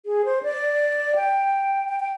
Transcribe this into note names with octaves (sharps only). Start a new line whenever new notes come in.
G#4
C5
D5
G5
G5
G5